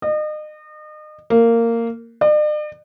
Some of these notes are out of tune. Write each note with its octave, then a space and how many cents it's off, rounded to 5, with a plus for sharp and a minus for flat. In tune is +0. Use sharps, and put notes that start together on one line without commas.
D#5 -35
A#3 -15
D5 +45